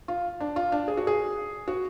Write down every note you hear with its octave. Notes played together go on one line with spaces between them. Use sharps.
F4
D4
F4
D4
G#4
F#4
G#4
F#4